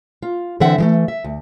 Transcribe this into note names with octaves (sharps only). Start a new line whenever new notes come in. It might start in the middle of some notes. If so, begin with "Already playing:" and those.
F4
D3 E3 C4 C5 E5 F#5
E3 G#3 A3
E5
D2